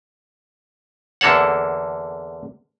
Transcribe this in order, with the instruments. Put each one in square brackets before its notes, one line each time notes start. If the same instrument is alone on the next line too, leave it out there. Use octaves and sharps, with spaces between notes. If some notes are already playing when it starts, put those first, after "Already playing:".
[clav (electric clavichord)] E2 D3 A#3 A4 C#5 F#5